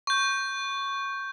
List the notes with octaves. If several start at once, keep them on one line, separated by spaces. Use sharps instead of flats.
C#6 G6